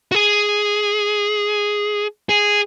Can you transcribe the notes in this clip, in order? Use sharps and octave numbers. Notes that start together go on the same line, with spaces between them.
F#4
G#4
G#4